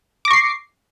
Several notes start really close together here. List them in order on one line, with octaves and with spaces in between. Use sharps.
D6 A#6 C#6 C7